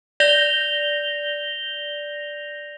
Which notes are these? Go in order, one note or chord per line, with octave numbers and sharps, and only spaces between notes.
D5 G6 A#6 F7 G7